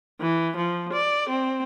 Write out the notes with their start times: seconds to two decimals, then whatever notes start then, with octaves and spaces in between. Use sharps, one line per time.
0.21 E3
0.57 F3
0.93 D5
1.29 C4